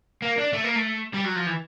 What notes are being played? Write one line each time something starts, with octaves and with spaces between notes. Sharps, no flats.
A#3
D4
A3
A#3
A3
G3
F#3
F3
E3